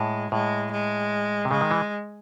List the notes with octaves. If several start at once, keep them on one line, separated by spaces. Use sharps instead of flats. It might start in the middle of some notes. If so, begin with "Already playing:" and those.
Already playing: A2 G#3
A2 G#3
G#3
C3
C#3 G#3
D#3
E3